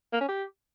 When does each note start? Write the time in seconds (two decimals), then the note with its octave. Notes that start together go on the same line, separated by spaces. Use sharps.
0.13 A#3
0.21 C#4
0.29 G4